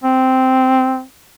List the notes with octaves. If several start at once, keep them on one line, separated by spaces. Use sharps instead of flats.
C4